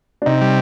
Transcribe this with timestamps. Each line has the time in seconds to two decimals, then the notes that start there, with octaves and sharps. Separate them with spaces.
0.22 D4
0.26 C3 D#4
0.41 G3